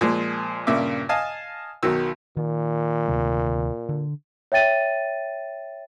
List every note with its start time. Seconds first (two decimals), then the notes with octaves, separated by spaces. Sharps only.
0.01 A#2 F3 G#3
0.67 G2 A#2 C#3 E5 D6
1.09 D#5 F5 G#5 A5
1.83 B1 D#3 F#3 E6
2.37 A#2 D#3
3.08 D2 C3 D#3
3.89 D3
4.52 C#5 E5 G5 A6 D#7